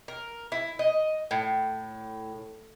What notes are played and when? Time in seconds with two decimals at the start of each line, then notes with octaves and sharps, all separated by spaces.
0.08 A#4
0.52 E4
0.79 D#5
1.31 A2